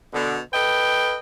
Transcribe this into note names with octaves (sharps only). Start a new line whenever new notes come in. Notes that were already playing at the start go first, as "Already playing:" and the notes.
B2 D3
A4 B4 D#5 G5